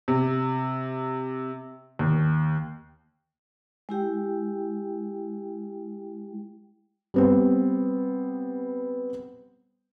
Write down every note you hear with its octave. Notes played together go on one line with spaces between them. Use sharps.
C3
D#2
G#3 E4 G4 G5
G3 B3 C4